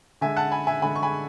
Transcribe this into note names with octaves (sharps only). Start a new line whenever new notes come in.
D3 G#3 E5 G#5
F#5 A5
G#5 B5
E5 G#5
D3 G#3 G#5 B5
C#6
G#5 B5